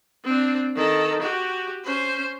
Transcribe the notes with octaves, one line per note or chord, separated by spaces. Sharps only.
C4 D4
D#3 A4
F#4 G4
C#4 C5